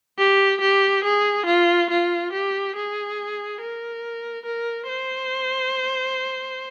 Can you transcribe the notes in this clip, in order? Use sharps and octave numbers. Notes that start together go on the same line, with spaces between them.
G4
G4
G#4
F4
F4
G4
G#4
A#4
A#4
C5